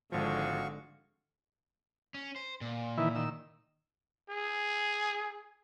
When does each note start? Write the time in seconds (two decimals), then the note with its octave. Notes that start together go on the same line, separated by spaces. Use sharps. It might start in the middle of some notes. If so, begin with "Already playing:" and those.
0.12 G#1 D3 F3 G#3 F#4 F5 C#6
2.14 C#4
2.36 C5
2.61 A#2
2.98 D#3 E3 E4
3.15 D#3 E6
4.30 G#4